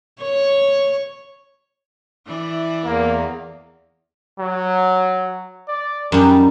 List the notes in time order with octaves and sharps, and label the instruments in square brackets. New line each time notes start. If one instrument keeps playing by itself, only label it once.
[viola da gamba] C#5
E3 E4 D5
[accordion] E2 [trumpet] A#3
[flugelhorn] F#3
D5
[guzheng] F#2 D#4 [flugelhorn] G3